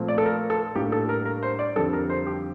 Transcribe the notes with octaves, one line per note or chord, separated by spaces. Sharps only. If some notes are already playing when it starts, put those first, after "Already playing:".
Already playing: A#2 F3 A3 C4
D5
A4
A#4
A4
A2 G3 A#3 D4 G4
A4
A#4
A#4
C5
D5
F2 D3 G3 A4
A#4
C5
G4